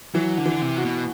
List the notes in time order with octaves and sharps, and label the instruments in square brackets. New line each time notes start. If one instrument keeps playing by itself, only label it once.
[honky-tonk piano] E3 [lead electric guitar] F#3
[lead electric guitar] D3
[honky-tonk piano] E3
[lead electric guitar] C3
[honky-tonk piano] F#4
[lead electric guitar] B2